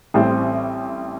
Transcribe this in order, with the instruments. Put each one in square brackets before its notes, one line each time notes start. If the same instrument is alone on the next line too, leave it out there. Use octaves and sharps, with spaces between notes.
[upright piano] A1 A2 G3 C4